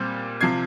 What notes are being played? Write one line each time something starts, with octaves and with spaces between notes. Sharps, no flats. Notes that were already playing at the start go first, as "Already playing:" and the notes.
Already playing: A#2 G3 C4 G6
C3 F3 G#6 C7